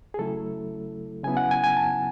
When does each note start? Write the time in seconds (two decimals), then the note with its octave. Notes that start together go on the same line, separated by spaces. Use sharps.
0.14 G#4
0.19 C#3 F#3 A3 E4 A4
1.24 C#3 F#3 B3 E4 G#5
1.37 F#5
1.51 G#5
1.64 G#5
1.77 A5